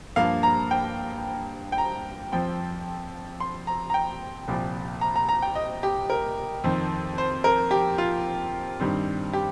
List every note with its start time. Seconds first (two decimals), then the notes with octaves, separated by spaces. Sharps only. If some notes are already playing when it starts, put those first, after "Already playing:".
0.16 G2 F3 A#3 F5
0.43 A#5
0.71 G5
1.72 G5
1.78 A#5
2.32 F2 F3 C4 G5
3.40 C6
3.67 A#5
3.90 A#5
3.94 G5
4.48 C2 A#2 F3
5.01 A#5
5.16 A#5
5.29 A#5
5.42 G5
5.55 D#5
5.83 G4
6.10 A#4
6.64 F2 D#3 C4
7.18 C5
7.44 A#4
7.71 G4
7.98 F4
8.80 G2 D#3 G3 C4
9.33 G4